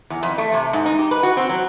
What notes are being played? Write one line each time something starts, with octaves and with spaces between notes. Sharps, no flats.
E2
F2
A3
C3
G#2
D#4
G4
B4
F#4
C4
F#3